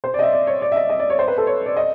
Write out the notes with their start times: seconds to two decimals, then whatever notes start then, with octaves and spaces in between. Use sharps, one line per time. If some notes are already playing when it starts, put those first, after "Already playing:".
0.04 C5
0.14 D5 D#5
0.23 E5
0.33 D5
0.47 C#5
0.62 D5
0.72 E5
0.76 D#5
0.89 D#5
1.00 D5
1.10 C#5
1.19 C5
1.28 B4
1.38 A4
1.47 C#5
1.66 D5
1.76 D#5